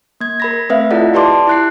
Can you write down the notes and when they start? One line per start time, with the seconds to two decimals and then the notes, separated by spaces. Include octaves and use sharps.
0.21 A#3 G#6
0.40 A#4 B5 A#6
0.69 A3 C4 B4 E5 F5
0.91 E4 F4 A4 D5 D#5 F#5
1.14 G4 B4 D5 A5 C6 D6
1.47 E4 F#6 C7